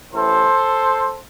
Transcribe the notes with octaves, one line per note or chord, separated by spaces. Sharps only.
A1 A2 E3 A4 C5